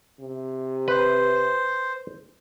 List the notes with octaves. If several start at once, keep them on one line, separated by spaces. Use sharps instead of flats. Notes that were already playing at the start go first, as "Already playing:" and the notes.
C3
B4 C5